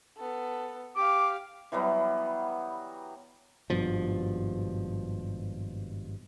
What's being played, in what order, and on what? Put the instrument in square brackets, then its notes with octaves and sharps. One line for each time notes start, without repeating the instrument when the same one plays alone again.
[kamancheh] B3 A4
[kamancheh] G4 F5 [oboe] D6
[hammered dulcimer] E3 F#3 G3 B3
[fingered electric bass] G#1 G2 B2 F3